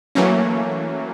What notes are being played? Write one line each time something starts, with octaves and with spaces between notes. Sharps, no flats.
E3 F#3 A3 A#3 C#4